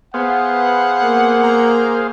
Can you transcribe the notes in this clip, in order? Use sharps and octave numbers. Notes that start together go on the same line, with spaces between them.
B3 G#4 C5 F5 F#5
A#3
A#5